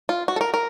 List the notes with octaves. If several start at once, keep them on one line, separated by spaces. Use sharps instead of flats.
F4
F#4
A4
A#4
A#4